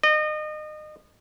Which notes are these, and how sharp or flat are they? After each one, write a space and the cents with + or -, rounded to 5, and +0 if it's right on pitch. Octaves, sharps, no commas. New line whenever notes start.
D#5 -30